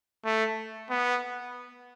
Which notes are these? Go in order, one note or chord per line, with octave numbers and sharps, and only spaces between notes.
A3
B3